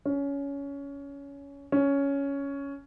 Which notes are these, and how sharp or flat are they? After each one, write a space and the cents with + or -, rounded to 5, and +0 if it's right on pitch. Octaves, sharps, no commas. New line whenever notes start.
C#4 +20
C#4 +10